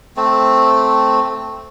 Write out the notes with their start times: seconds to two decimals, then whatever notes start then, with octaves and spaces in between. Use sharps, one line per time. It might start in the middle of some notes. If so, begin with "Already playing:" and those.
0.17 A3 C4